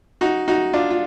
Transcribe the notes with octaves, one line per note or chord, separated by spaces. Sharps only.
D#4 F#4
D#4 F#4
D4 F4
F4